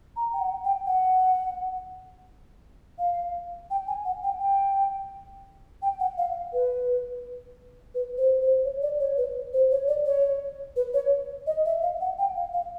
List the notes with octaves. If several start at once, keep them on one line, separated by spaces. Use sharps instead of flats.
A#5
G5
F#5
G5
F#5
F5
G5
G#5
F#5
G5
G5
G5
F#5
F5
B4
B4
C5
C5
C#5
D5
C#5
B4
C5
C#5
D5
C#5
B4
C#5
D#5
E5
F5
F#5
G5
F5
F5